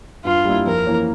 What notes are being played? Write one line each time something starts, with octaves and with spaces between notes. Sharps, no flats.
G2 F4
G3 A#3 E4
F2 A#4
E3 A#3 C#4